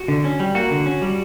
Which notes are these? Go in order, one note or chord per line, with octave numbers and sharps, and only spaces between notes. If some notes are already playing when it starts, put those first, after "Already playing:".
Already playing: F#4
D3
C#4
G3
A#3 F#4
D3
C#4
G3